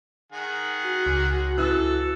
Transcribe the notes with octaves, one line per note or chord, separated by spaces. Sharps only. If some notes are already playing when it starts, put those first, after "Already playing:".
D#3 G#4 F#5
F#4
C#2
E3 A4 E6 F#6